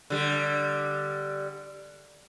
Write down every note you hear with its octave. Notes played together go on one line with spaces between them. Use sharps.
D3 G3